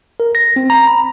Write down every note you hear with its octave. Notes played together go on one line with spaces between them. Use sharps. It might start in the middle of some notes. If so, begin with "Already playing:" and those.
A#4
A#6
C4
A#5
B5